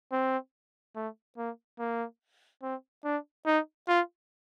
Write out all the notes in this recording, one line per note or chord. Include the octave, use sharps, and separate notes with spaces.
C4
A3
A#3
A#3
C4
D4
D#4
F4